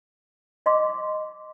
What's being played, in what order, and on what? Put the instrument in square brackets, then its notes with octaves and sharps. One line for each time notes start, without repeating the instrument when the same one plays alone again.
[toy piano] D#5 C6 D6